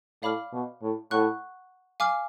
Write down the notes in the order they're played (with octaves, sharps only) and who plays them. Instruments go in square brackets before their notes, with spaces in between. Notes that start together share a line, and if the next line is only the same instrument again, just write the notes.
[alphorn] A2 [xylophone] D5 F5 B5 D6 F6
[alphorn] B2
A2
[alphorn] A2 [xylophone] F#5 C#6 F#6
[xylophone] F5 G#5 D6 F6